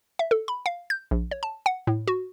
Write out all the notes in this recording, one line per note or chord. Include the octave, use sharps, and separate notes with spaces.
E5
A4
B5
F5
G6
A#1
C#5
A5
F#5
A2
F#4